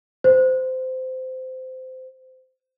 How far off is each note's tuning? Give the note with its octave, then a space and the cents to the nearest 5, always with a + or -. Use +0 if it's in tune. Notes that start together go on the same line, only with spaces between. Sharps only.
C5 -20